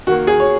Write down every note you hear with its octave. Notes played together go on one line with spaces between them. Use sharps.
D#3 A#3 F#4
G#4
C#5